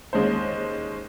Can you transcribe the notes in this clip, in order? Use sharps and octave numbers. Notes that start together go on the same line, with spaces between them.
D#2 G#3 C#4 C5